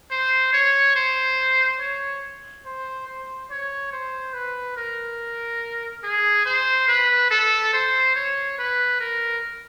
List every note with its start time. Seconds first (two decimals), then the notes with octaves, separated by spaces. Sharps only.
0.11 C5
0.53 C#5
0.96 C5
1.80 C#5
2.65 C5
3.07 C5
3.50 C#5
3.92 C5
4.34 B4
4.76 A#4
6.04 G#4
6.45 C5
6.88 B4
7.31 A4
7.73 C5
8.16 C#5
8.58 B4
9.00 A#4